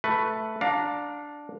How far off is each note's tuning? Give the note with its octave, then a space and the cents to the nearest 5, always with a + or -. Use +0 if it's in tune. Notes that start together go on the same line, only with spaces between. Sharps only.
A3 +0 B4 +0
D4 +0 F5 +30 A#5 +0